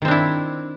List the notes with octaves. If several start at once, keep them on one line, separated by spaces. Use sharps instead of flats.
D#3 C4 D4 E4